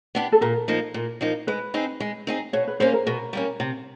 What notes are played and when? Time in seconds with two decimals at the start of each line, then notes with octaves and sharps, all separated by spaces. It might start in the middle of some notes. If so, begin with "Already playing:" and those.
0.15 B3 D4 G4
0.32 A4
0.41 A#2 A#4
0.68 F3 A#3 D#4
0.94 A#2
1.21 F3 A#3 D#4
1.47 G#3 B4
1.74 C4 D#4 G#4
2.00 G#3
2.27 C4 D#4 G#4
2.53 B2 C#5
2.68 B4
2.80 G3 A#3 C#4 C5
2.93 A#4
3.06 B2 A#4
3.33 G3 A#3 C#4
3.60 C3